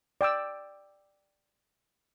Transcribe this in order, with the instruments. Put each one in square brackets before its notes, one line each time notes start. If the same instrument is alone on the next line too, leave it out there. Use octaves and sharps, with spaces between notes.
[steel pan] D5 G5 D6 E6